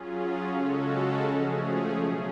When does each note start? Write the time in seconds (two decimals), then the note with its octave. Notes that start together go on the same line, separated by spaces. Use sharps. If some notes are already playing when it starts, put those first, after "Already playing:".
Already playing: F#3 C#4 F4 G#4
0.50 C#3 G#3 C#4 F#4 A4
1.24 F3 A3 C#4 G#4
1.97 B2 F#3 C#4 F4